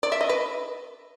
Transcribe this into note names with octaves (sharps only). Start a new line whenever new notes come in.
D5
E5
D#5
B4